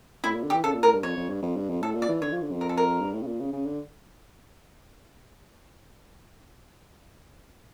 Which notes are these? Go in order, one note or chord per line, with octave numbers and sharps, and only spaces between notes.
A2 E4
A#2
D3
G4
E3
C#3 A4
A#2
A2 A#4
G2
F2 C#5
F2
G2
F2
G2
F2
A2 A4
A#2
D5
E3
D3 C#5
F3
D3
F2
A#4
A4
A#4
G2
A2
C#3
A#2
C#3
C#3
D3